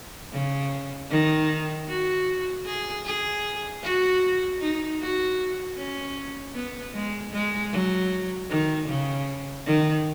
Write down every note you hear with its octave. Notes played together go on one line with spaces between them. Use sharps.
C#3
D#3
F#4
G#4
G#4
F#4
D#4
F#4
C#4
B3
G#3
G#3
F#3
D#3
C#3
D#3